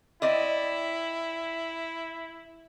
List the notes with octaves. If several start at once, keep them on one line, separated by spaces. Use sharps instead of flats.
C4 E4 D5 D#5